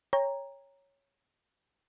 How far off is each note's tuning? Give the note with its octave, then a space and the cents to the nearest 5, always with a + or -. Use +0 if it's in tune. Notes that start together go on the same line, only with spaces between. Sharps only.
C#5 +0 G5 +30 A#5 +0